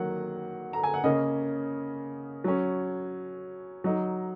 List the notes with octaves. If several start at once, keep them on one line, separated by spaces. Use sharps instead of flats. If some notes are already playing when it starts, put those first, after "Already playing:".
Already playing: D#3 F#3 A#3 F#5
A#5
G#5
F#5
C#3 A#3 C#4 D#5
F#3 C#4
F#3 D#4